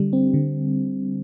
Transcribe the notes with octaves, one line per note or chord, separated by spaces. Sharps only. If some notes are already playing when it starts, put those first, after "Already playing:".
Already playing: D3 G3
C4
D3